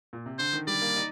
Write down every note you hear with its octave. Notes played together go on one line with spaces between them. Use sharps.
A#2
C3
D3 C5
D#3
G3 D5
A#3
D#4